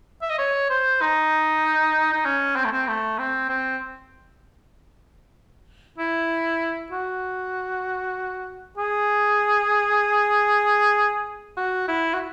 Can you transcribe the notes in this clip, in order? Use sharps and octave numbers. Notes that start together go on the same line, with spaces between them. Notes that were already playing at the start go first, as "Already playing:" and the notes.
E5
D#5
C#5
C5
D#4
D#4
C#4
C4
A3
C4
A3
C4
C4
E4
F#4
G#4
F#4
E4
F#4